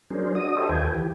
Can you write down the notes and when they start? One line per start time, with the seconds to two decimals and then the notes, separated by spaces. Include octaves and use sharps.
0.10 F#3 C#4 D4 G#4 A#4 C5
0.35 D4 F#4 D#5 D#6
0.57 G4 A4 C5 C#5 D#5 E5
0.69 D#2 F4 A4 B4 G5 G#5
0.95 E3 G4